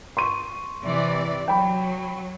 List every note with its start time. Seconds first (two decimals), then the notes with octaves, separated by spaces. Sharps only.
0.17 C6 C#6 D#7
0.83 C3 E3 D5
1.48 F#3 G5 B5